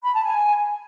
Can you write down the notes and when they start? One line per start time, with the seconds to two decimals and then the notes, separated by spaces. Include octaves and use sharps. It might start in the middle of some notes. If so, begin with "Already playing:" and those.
0.03 B5
0.13 A5
0.24 G#5